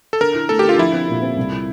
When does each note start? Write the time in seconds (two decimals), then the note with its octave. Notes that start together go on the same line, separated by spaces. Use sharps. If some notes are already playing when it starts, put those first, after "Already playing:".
0.13 A4
0.21 D3 A#4
0.35 E4
0.49 A3 A4
0.59 G4
0.64 D3 F4
0.78 F3 E4
0.93 C4
1.08 A#2
1.22 C4
1.36 C2